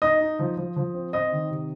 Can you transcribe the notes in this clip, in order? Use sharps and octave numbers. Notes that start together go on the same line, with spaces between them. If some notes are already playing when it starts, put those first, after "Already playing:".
D#4 D#5 D#6
D#4
F3
F3
F3
C4
C4 D#5 D#6
D#3
C3